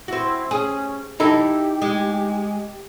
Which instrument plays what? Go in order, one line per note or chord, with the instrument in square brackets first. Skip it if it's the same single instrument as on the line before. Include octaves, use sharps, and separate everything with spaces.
[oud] C4 F#4 [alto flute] E4
[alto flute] C#4 [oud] G#4
[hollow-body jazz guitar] D#4 E4 A4 [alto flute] G4
[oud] G#3